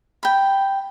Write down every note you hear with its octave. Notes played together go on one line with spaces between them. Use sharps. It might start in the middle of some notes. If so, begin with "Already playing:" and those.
G5 B5